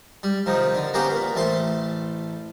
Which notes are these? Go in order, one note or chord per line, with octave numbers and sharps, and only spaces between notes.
G3
C3 D#3 F3
D3
A#3 B3 C#4 F#4 G4 C5
A#2
A1 A3 C5 A5 C6